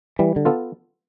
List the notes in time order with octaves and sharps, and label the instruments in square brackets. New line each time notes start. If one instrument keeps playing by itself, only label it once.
[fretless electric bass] E3 [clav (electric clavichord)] G3
[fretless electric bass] D3
[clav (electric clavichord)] B3 F4 A4